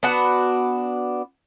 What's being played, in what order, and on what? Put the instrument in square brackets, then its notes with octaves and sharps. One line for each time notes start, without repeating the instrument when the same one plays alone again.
[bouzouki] B3 D4 F#4 F#5